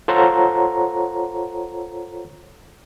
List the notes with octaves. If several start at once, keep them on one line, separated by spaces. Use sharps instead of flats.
F4 A4 C5 C#5 F#5 A#5